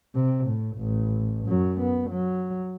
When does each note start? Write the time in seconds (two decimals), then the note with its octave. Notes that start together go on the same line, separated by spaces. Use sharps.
0.15 C3
0.47 A2
0.77 A1
1.47 F#2 F#3
1.81 B3
2.11 F#3